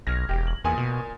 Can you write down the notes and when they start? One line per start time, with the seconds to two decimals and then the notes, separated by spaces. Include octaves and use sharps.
0.07 B1 F6 G#6 A#6
0.29 E1 G4
0.47 F#7
0.64 E2 A#2 G#5 D#6
0.77 B2